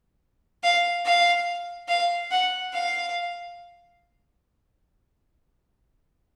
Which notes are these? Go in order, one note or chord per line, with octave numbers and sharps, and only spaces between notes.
F5
F5
F5
F#5
F5